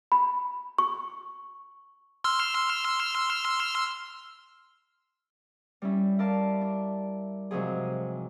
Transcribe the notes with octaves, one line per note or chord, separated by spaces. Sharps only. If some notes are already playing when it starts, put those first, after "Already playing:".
B5
C#6
C6 E6 F6
G3 C#4 E4
E4 A#4 D5 F5 A5
D4
G#2 C3 F3 F#3 G#4